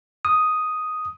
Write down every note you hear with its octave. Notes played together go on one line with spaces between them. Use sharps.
D#6